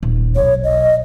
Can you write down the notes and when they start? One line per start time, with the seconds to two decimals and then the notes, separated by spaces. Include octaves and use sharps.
0.03 D#1
0.36 B1 C#5
0.64 D#5